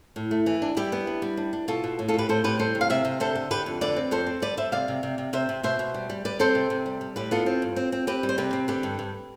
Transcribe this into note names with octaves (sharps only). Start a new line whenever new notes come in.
A2
A3
E3
D4
G3 E4 G4
B3
D4
G3
D4
D4
B2 F4 A4
B2
A2
F4 A4
A2 G4 B4
A2 A4 C5
A2 G4 B4
G3 A4 C5
C3
F5
C3 C5 E5
C3
D3 A4 C5
D3
D3 G4 B4
F2
D3 B4 D5
C4
F2 A4 C5
C4
G3 B4 D5
G3 C5 E5
C3 D5 F5
C3
C3
C3
C3 C5 E5
C3
B2 C5 E5
B2
G3
G3
G3 B4 D5
C4 A4 C5
C3
C3
G3
G3
A2 G4 B4
B3 F4 A4
C4
G2
C4
C4
C4 G4 B4
G3
C5
C3 G4 B4
C4
D3 G4 B4
G2
G2